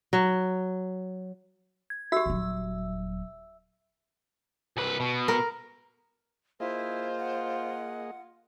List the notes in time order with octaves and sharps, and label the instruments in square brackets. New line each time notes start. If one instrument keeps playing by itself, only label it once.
[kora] F#3
[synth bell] G#6
[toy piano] F#4 G4 [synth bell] E5 E6
[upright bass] D#1 F#3
[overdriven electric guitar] C2 B4
B2
[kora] A#4
[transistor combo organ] A#3 G#4 D#5 [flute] E4 [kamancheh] F4 [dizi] C5
[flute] F#5